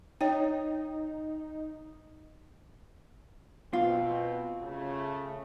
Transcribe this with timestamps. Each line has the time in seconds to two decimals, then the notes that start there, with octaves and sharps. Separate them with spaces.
0.21 D#4 C#5 G5
3.73 B2 C4 F4
4.62 C#3 A3